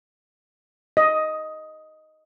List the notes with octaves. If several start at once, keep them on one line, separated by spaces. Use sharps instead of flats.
D#5